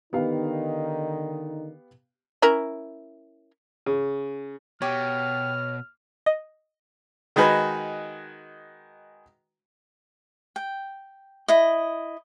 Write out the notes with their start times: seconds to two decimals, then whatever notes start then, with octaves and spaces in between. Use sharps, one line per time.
0.13 D3 D#3 B3 D#4 G4 F5
2.42 C#4 E4 A#4
3.86 C#3
4.82 B2 G4 C#5 F6
6.26 D#5
7.36 D#3 G#3 D#4 F#4 G#4 B4
10.56 G5
11.48 E4 D#5